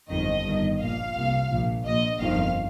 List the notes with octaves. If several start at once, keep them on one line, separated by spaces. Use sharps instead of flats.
G1 F2 D#3 D#5
G1 G2 D#3
A#1 A#2 F5
C2 A#2
A#1 A#2
A#1 A#2 D#5
G1 F2 D#3 F5